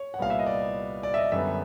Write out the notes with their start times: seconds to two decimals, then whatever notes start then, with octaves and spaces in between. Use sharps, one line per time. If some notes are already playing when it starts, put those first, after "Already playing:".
Already playing: C#5
0.14 F#5
0.19 C2 A#2 G3 B3 F5
0.30 E5
0.39 D#5
0.46 D5
1.03 D5
1.14 E5
1.17 D#5
1.32 F#2 D3 G3 B3 E5